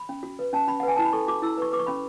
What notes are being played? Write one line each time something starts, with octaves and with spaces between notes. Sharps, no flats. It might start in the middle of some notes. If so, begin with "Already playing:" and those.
Already playing: B5
C#4
F#4
B4
C#4 A5
C#4 B5
F#5
B4 G#5
E4 A5
B5
A4 C#6
F#4 D6
E4 E6
B4 C#6
B4 D6
C#6
C#4 B5